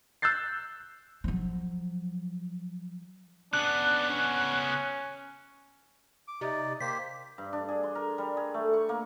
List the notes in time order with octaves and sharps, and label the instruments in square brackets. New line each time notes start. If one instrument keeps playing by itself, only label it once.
[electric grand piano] E6 F#6 G6 A6 C7
[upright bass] F3 F#3
[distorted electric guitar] C#3 B3 [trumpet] D4 [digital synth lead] F#6
[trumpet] C#4
[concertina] D6
[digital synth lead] C3 [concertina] D#4 D5
[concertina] A#3 G4 C5 [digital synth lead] B6
[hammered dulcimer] G2
D4
G#4
C6
A#4
G3
G#4
A3
C#6
A#3